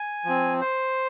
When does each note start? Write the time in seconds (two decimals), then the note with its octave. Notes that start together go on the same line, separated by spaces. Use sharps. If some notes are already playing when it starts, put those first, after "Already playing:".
Already playing: G#5
0.24 F3 C4
0.61 C5